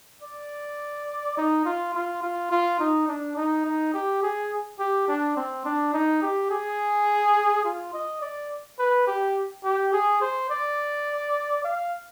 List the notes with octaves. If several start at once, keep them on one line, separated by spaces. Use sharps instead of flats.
D5
D#4
F4
F4
F4
F4
D#4
D4
D#4
D#4
G4
G#4
G4
D4
C4
D4
D#4
G4
G#4
F4
D#5
D5
B4
G4
G4
G#4
C5
D5
F5